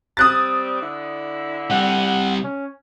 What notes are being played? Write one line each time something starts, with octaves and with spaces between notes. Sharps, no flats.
G3 C4 D#6 F#6 A6
D3 E4
C3 G3 F#5
F#5
C#4